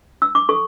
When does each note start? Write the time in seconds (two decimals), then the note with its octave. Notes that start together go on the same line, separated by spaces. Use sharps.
0.22 E6
0.35 D6
0.49 A4 C#6